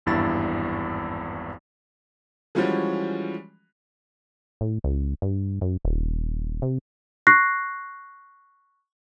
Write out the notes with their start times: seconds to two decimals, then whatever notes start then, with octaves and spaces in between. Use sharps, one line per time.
0.06 G#1 E2 G2 E4 A6
2.55 E3 F3 G3 G#3 C#4 F#4
4.61 A2
4.84 C#2
5.22 G2
5.61 F#2
5.85 D#1
6.62 C3
7.27 C#6 F#6 A#6 C7